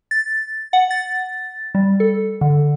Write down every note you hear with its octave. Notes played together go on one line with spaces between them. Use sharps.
A6
F#5
A6
G3
A4
D3